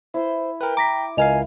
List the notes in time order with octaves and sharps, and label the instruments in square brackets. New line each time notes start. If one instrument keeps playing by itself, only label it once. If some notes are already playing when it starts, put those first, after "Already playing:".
[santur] E4 [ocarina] C5
[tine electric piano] A#4 B4 [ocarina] G5
[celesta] A#5 A#6 B6 [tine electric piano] D6
[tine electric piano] C#2 A#4 F5 [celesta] D#5 F7 [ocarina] G#5